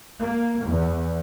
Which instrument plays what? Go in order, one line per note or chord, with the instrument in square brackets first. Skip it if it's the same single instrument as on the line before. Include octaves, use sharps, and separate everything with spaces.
[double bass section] A#3
E2